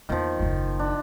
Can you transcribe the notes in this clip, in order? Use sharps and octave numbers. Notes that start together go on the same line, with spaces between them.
E2 D#3 F3 A#3
F#1 D#2
D4